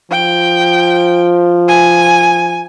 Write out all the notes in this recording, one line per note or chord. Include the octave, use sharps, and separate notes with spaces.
F3 G5
G#5